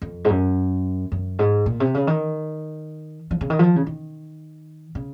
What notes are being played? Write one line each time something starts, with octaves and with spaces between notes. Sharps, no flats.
F2
G#2
F#2
F#2
G#2
A#2
C3
C#3
D#3
F3
C#3
D#3
F3
C#3
D#3
C#3